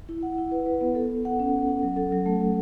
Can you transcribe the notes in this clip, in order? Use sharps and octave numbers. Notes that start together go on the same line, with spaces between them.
E4
F#5
E4
B4
B4
B3
A4
A4
F#5
C#4
C#4
F#5
F#3
A4
F#3
A3
A3